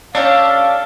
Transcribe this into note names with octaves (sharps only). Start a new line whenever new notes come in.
C#4 D4 G4 A4 C#5 F5 C#6